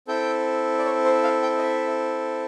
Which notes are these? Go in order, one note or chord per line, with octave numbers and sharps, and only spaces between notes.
C4 E4 A4 G5
D5
C#5
C5
F5
G5
D#5
E5